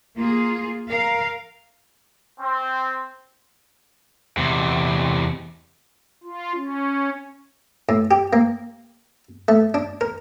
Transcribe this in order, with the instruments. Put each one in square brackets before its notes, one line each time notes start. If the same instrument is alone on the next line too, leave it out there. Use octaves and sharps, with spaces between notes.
[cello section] A#3 F4 G#4
A#4 F5
[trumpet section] C4
[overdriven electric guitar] E2 C3
[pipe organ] F4
C#4
[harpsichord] A2
G4
A#3
A3
D4
A#4